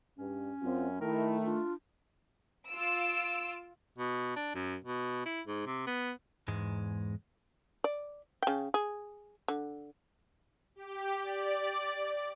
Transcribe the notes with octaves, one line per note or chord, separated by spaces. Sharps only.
G2 C#4
F#2 C4 F4
D#3 A3 E4 A#4
D4 F4
F4 E6 D7
B2
D4
F#2
B2
E4
G#2
C3
B3
E2 G#2 G#3
D5
C#3 G5
G#4
D3
G4
D5